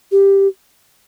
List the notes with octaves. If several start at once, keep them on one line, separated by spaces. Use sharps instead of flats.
G4